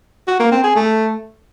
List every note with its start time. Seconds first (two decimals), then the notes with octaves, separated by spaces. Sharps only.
0.28 F#4
0.40 A#3
0.52 C4
0.63 G#4
0.75 A3